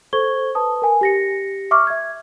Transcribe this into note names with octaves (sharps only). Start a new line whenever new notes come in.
A4 C5 C#6 G#6 G7
B4 A5 D#6
A#4 G#5
G4 A#6 C#7
E5 C#6 D6 F6
E5 G#6